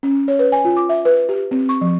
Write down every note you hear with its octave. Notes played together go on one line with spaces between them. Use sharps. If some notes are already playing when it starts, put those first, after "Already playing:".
C#4
C#5
B4
G#5
F4
D6
E5
B4
G4
C4
C#6
F3